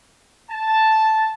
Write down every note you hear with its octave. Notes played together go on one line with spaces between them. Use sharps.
A5